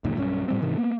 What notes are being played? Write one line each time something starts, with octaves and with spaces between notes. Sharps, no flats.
C#2 F#2 A#2 D#3
B1 G2 D#3 C#4
A2 G3 C4
G#2 C3 D#3 E3
A#3 B3